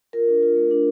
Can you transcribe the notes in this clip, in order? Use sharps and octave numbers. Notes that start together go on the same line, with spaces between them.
F4 A#4
D4
F4
A3
D4